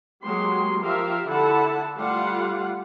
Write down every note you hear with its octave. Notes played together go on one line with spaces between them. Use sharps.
F#3 G#3 A#3 G4 C6
F3 F4 G4 A#4 E5 F5
D3 E4 A4 F#5 A5
G3 A3 F4 G4 F5 F#5